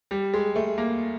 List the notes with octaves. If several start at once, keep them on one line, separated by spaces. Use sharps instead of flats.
G3
G#3
A3
A#3